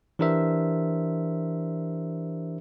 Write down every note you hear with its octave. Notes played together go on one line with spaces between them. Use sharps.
E3 D4 G4 A#4 C5 E5